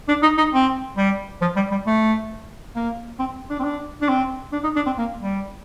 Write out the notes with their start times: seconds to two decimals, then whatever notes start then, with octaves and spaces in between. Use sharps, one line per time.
0.08 D4
0.23 D#4
0.37 D#4
0.53 C4
0.97 G3
1.41 F3
1.56 G3
1.71 G3
1.87 A3
2.76 A#3
3.19 C4
3.50 D4
3.59 C4
3.64 D4
4.01 D4
4.09 C4
4.52 D4
4.63 D#4
4.76 D4
4.86 C4
4.98 A#3
5.20 G3